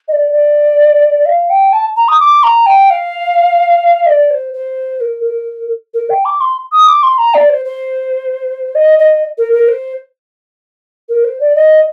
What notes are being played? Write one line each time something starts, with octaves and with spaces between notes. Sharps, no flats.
D#5
D5
D5
F5
G5
A5
A#5
D#6
D6
A#5
G5
F5
D#5
D5
C5
C5
A#4
A#4
A#4
G5
D6
C6
D#6
D6
C6
A#5
D5
C5
C5
D#5
D#5
A#4
A#4
C5
A#4
C5
D5
D#5